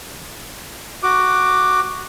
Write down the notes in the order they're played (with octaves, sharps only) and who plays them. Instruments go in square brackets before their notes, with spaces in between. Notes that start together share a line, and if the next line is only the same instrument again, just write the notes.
[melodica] F#4 D6